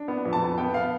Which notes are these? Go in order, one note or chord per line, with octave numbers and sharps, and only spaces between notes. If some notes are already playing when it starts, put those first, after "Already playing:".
Already playing: D4
B3
F2
A5
B3
B3 G5
F5